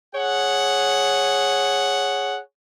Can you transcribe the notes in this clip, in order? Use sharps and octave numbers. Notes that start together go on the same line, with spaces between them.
G#4 C#5 F#5